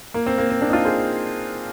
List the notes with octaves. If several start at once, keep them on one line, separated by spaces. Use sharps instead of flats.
A#3
C4
A#3
C4
A#3 D4
D#4
D4 F4
G#4 C5